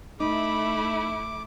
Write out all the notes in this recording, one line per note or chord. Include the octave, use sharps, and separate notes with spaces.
A3 D#4 E4 B5 D6